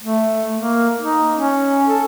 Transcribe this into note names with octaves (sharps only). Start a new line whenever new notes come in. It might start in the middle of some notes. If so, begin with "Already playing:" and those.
A3
A#3
D#4
C#4
A4